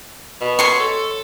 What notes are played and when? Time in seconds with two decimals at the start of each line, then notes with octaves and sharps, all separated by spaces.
0.41 B2
0.59 C#5 C6 C#6
0.80 A4